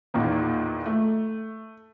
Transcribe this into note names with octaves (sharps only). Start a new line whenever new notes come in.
E2 A#2 D#3 A#3
A3